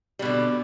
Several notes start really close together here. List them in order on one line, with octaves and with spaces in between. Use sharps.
G3 B2 D3